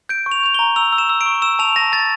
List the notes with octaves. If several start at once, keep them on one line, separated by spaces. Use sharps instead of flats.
G6 D7
C#6
F7
G6 F7
A#5 G7
E6 F7
E6
E7
E6
D7
C#6
E6 E7
A5 F7
A5 A#6
A5 A6